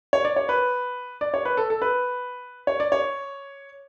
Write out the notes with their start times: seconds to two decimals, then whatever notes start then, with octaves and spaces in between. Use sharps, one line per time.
0.13 C#5
0.25 D5
0.36 C#5
0.49 B4
1.21 D5
1.34 C#5
1.45 B4
1.57 A4
1.70 A4
1.82 B4
2.67 C#5
2.80 D5
2.92 C#5